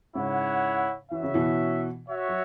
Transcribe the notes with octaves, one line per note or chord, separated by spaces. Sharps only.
G#2 C#3 E4 C#5 F#5
E3 C#4 F#4 E5
C#3
B2 E3
F#4 C#5 E5
F#3